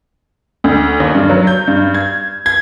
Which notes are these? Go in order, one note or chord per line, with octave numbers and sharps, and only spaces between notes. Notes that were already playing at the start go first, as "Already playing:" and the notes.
D2
D#2
G2
F#3
G6
G2
G#6
G#6